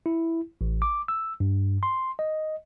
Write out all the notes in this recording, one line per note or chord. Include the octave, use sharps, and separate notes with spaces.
E4
A1
D6
E6
G2
C6
D#5